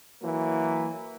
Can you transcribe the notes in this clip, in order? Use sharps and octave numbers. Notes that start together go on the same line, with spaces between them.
E3 F#3 A#3